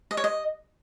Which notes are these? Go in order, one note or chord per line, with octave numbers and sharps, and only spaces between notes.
D#5
C#5
D#5